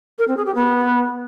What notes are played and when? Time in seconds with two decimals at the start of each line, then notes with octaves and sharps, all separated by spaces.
0.19 A#4
0.28 C4
0.37 G#4
0.46 G4
0.55 B3